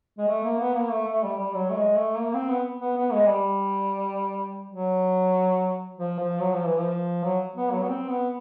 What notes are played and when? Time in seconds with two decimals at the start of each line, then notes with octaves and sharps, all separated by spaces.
0.18 G#3
0.28 A3
0.44 A#3
0.59 B3
0.75 A#3
0.91 A3
1.08 A3
1.23 G3
1.39 G3
1.54 F#3
1.71 A3
1.76 G#3
1.97 A3
2.18 A#3
2.34 C4
2.50 B3
2.81 B3
2.97 B3
3.13 G#3
3.29 G3
4.71 F#3
5.98 F3
6.19 F3
6.40 F#3
6.54 F3
6.66 E3
6.79 F3
7.24 F#3
7.55 B3
7.71 F#3
7.83 B3
7.88 C4
8.09 B3